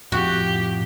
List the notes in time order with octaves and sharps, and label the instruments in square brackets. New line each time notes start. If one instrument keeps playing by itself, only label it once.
[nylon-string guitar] F2 [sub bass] A2 [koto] F#4 [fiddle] G4